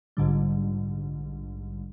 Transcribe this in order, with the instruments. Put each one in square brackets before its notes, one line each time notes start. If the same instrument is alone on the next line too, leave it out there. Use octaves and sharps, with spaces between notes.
[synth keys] A#1 G#2 D3 G3